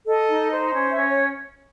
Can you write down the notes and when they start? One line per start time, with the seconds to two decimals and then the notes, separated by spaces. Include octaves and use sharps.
0.06 A4 D#5
0.29 D#4
0.51 C5
0.74 C#4
0.91 E5
0.97 C#4
1.08 C#5